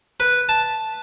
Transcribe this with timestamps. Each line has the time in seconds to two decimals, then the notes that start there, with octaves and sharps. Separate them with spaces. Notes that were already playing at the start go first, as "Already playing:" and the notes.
0.20 B4
0.49 A5